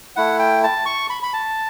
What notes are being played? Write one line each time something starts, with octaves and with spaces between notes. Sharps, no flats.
A3 E4 F#5
G5
A5
C#6
B5
B5
A5